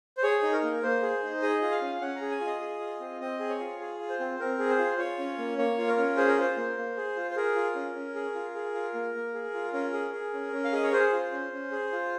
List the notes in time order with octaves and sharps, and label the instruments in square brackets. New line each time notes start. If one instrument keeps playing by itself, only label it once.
[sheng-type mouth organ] C5
G#4 C#5
D#4
A#4
A#3
A#3 C5
G#4
D#4
G#4 D#5
F4
F5
C#4
C#4 F#5
A#5
G#4
G#5
F4
D#5
G#4
F4
C4
C4 D#5
G#4
C#5
F4
G#4
F4
C5
C4
C4 A#4
G#4
C5
F4
F4 C#5
C#4
A#3
A#3 C#5
F4
A#4
C#4
G#4 C5
A#4
F4 C5
A#3
A#3
G#4
F4
C5
G#4 A#4
F4
C#4
C#4
G#4
F4
G#4
F4
A#3
A#3
G#4
F4
C#4 A#4
G#4
G#4
C#4
C#4
F5
G#4 D#5
C#5
G#4 C5
F4
C#4
C#4
G#4
F4